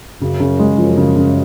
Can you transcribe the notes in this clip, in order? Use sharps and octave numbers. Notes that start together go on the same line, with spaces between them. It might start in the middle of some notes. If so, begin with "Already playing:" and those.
F#2 C#3
C#3
G#3
F#2 F3
C#3
C#3